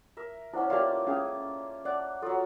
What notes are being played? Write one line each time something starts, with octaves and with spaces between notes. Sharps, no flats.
A#4 E5
C#4 D4 E4 C5 F#5
A3 A#3 F4 G4 D5 F5
C#4 G#4 F5
D5 F#5
F#3 F4 A4